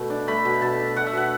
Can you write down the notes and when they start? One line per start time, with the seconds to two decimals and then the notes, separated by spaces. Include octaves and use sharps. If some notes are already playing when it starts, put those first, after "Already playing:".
Already playing: B2 A3
0.10 D4
0.28 A3 B5
0.45 B2
0.62 B2 A5
0.80 D4
0.96 A3 F#5
1.07 E5
1.13 B2 F#5